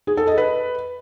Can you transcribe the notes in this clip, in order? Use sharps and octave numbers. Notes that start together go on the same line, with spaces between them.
G#4
A4
D#5
B4